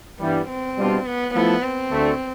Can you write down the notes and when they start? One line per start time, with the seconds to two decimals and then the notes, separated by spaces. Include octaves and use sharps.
0.20 G2 E3 G3 B3
0.48 C4
0.77 B2 G3 D4 F4
1.06 B3
1.34 F3 A3 B3 E4 A4
1.63 C4
1.91 D2 D3 A3